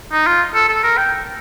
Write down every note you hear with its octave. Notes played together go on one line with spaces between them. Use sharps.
D#4
F4
A4
A4
A#4
G5